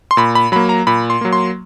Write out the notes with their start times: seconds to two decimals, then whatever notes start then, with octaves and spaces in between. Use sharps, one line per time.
0.11 C6
0.17 A#2 B5
0.35 B5
0.52 F#3 A#3 B5
0.69 A#5
0.87 A#2 B5
1.10 C6
1.21 F#3 A#3
1.33 C6